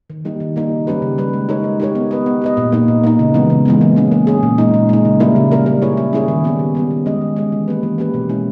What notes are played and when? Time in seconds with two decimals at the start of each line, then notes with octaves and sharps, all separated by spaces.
0.10 D#3
0.25 G3 A#3 D#4 G4
0.40 D#3
0.56 G3 A#3 D#4 G4
0.72 C#3
0.87 G3 C#4 G4 B4
1.02 C#3
1.18 G3 C#4 G4 B4
1.33 G#3
1.49 D#4 G4 A#4 C#5
1.64 G#3
1.80 D#4 G4 A#4 C#5
1.95 B3
2.11 G4 B4 D#5
2.26 B3
2.42 G4 B4 D#5
2.57 A#2
2.72 A#3 D#4
2.88 A#2
3.04 A#3 D#4
3.19 C#3
3.34 E3 G#3 B3
3.50 C#3
3.66 E3 G#3 B3
3.81 A#3
3.96 C#4 G#4
4.12 A#3
4.27 C#4 G#4
4.43 A#2
4.58 G#3 D#4
4.74 A#2
4.89 G#3 D#4
5.05 C#3
5.20 G3 A#3 E4 A#4
5.36 C#3
5.51 G3 A#3 E4 A#4
5.66 G3
5.82 C#4 E4 G#4 C#5
5.97 G3
6.13 C#4 E4 G#4 C#5
6.28 D#3
6.44 G3 B3 G4
6.59 D#3
6.75 G3 B3 G4
6.91 D#3
7.06 G#3 C#4 G#4 D#5
7.21 D#3
7.36 G#3 C#4 G#4 D#5
7.52 E3
7.68 A#3 C#4 G4 B4
7.83 E3
7.98 A#3 C#4 G4 B4
8.14 B2
8.29 G#3 C#4 E4